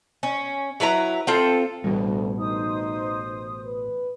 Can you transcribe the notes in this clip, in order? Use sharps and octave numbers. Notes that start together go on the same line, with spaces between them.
C#4
F#3 E4 B4 A#5
C4 F4 A4
A1 D2 B2 G3
D#4 C5 D#6
B4